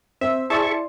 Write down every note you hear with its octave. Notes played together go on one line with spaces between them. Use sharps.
C4 C5 E5
E4 G#4 D5 E5 A5 C6 C#6